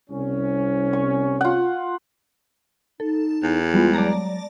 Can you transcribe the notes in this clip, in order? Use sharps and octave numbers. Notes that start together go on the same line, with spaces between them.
C2 C#4
C#6
F4 F#5
D#4 A4
E2
G3 G#3 B3 F4
F#3 D5 A5 A#5